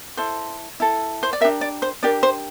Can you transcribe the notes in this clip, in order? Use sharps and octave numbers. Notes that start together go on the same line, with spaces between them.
E4 A4 C5
E4 A4
C5
D5
D4 G4 A#4 E5
D5
C5
D4 G4 A#4 D5
C5